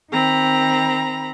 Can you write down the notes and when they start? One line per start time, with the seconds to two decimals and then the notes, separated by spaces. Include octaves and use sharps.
0.10 D#3 C4 A#5 B5